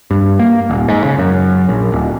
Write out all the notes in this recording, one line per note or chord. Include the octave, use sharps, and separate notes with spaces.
G2
A#3
D#1
G#2
C#3
F#2
A#1
D1